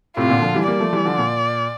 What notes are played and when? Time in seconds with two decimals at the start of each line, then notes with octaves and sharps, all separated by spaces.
0.17 A2 C3 F4
0.30 A#2 D3
0.42 D3 F3
0.55 E3 G3
0.68 G3 A#3 D5
0.80 F3 A3
0.93 E3 G3
1.05 D3 F3
1.18 A#2